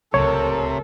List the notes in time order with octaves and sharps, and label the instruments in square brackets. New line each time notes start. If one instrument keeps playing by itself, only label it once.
[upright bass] D1 C#2 [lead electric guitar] C3 [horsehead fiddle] A4 A#4 [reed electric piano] C#5